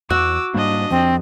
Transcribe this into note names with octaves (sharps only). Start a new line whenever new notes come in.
E2 F#4 D6 E6
G#2 G3 A#3 D4 D#5
F2 F3 C4